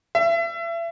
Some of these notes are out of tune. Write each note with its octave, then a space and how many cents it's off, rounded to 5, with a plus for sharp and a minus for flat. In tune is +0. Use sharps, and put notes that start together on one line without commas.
E5 +35